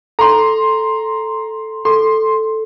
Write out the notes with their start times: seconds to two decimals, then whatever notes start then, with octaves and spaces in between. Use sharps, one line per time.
0.19 A4 A#5 C6
1.85 A4 C6